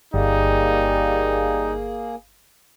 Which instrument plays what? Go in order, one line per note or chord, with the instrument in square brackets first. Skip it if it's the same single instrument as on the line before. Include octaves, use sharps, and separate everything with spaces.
[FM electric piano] G1 [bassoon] G3 [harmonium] A#3 G#4 [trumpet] D#4